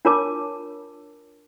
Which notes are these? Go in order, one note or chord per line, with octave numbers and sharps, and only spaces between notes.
D4 F4 A#4 C#5 A5 D6